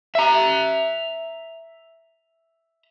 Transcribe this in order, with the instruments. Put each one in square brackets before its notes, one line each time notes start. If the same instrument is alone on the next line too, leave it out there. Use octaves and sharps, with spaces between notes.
[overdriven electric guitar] E5 A#5